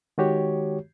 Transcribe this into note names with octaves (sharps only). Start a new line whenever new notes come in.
D#3 G#3 F#4 G4 C#5